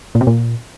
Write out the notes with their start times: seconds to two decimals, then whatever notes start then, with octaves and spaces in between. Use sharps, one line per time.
0.15 A#2
0.21 C3
0.27 A#2